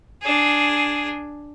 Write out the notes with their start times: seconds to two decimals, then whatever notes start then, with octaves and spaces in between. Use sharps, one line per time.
0.22 D4 G#4